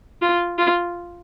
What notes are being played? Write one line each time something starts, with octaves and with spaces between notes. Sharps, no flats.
F4
F4